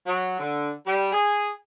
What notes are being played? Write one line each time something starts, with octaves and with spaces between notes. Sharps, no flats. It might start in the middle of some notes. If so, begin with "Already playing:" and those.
F#3
D3
G3
G#4